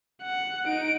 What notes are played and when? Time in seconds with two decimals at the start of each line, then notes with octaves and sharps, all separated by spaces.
0.23 F#5
0.67 D#4 D7